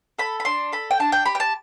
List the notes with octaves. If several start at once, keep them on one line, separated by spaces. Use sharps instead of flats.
A4 B5
B5
D4 C6
A4 B5
G5
D4 A5
G5
G4 B5
G5
A5